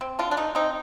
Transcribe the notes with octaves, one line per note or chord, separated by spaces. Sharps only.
C4
D3 F4
D4
A3 D#4
C4 D#4